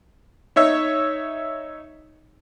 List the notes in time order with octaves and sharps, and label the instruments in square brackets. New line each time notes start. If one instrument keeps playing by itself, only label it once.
[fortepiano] D#4 C#5 E5